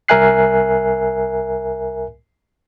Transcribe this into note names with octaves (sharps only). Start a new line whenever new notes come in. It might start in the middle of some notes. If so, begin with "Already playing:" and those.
C2 A#4 E5 G#5 F#6 C7